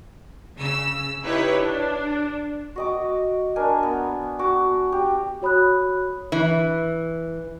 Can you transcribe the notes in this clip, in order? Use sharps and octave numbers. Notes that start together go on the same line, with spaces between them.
C#3 E6
D#4 E4 G4 B4 C#5
D4
F#4 D#5 D6
D4 A#4 G#5
B3
F#4 F#5 D6
G4
F#4 C#5 B5 D#6 F#6
E3